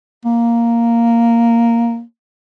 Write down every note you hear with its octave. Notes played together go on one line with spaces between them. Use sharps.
A#3